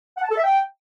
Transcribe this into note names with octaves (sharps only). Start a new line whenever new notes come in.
F#5
A5
A4
E5
G5